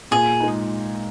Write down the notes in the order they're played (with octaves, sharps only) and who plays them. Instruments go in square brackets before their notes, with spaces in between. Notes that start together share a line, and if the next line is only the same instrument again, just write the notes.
[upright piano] A#2 [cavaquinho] G#4
[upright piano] G#3 D#4